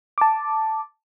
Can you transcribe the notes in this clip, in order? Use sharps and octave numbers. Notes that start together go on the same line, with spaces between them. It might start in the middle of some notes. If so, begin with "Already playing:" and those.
A5 D6